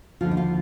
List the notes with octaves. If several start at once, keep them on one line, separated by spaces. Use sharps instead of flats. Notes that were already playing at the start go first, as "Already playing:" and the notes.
D#2 D3 F3 F4
D#4
F4